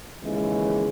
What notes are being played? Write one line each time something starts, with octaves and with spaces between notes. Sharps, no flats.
D#2 C#3 E3 G#3